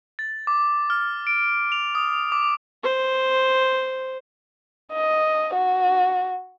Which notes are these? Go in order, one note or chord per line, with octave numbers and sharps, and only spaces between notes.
A6
D6
F6
D7
F7
D#6
D6
C5
D#5
F#4